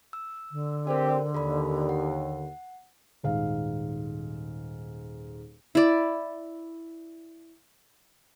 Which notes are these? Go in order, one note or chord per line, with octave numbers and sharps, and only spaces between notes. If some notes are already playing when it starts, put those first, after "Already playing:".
E6
D3
C4 G4 A#4 C5 D5
D#2 A4 D5 B5
F#5
D#1 G#2 F5
E4 D5